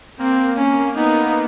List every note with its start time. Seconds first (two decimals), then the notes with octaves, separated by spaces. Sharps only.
0.19 A#3 C4
0.58 C#4
0.97 B3 D#4